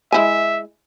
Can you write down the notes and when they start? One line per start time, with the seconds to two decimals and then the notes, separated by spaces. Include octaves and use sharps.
0.12 G#3 E4 E5 G#5